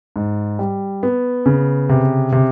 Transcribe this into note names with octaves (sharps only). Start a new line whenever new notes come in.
G#2
G3
B3
C#3
C3
C3